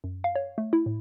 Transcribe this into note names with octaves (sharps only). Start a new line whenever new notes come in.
F#2
F5
C#5
A3
E4
A2